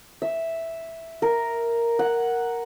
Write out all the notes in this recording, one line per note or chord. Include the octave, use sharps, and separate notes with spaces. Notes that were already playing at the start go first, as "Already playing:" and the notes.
E5
A#4
F#5